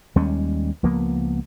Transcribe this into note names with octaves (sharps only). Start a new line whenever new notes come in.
D#2 G3 G#3 C#4
C#2 F3 A#3 B3